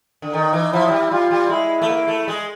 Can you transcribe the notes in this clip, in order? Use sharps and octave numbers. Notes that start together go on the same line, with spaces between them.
D3
D#3 D#4
E3
F3 E4
F#3
G3
G3 F4
G3
G#3 E4
A3
A#3
A3
G#3